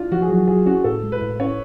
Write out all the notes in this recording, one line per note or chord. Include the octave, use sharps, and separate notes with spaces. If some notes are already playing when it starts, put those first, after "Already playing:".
Already playing: D4 F4
F3 F#4
G#4
F#3 F#4
F#3 G#4
C#4 F#4
A2 A4
G#3
B4
A2
C#4 C#5